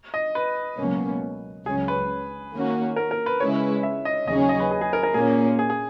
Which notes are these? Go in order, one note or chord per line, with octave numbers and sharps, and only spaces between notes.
D#5
B4
C#2 B2 F#3 A#3 C#4
C#2 C#3 F#3 C#4 G#4
B4
D#3 A#3 C#4 F#4
A#4
A#4
B4
C#3 G#3 C#4 E4 B4 C#5
E5
D#5
D#2 C#3 F#3 C#4 G#4 D#5
D#5
B4
G#4
G#4
A#4
A#4
A#2 A#3 C#4 G#4
G#4
G#4